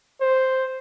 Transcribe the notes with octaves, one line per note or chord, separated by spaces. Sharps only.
C5